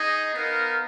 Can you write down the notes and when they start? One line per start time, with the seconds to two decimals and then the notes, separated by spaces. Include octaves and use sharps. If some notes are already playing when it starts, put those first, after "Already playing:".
Already playing: D#4 G#4 D#5
0.33 B3 D#4 A#4 F5